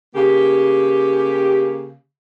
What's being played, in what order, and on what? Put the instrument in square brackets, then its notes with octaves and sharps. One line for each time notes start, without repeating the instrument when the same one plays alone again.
[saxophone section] C#3 A#3 G4